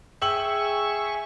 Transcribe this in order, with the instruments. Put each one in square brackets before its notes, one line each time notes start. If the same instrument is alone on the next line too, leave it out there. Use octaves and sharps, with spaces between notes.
[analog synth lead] G#4 [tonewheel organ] E5 C#6 [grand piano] G5 E6 F#7